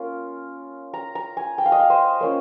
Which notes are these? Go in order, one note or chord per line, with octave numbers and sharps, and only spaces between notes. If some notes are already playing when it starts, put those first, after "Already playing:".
Already playing: A#3 C#4 F4
A#5
A#5
G#5
G5
F5
D#5
F5
C5
A#3 C#4 F4